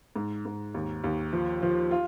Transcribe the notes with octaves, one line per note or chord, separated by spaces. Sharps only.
G#2
G#2
D#2
D#2
F3
F3
F4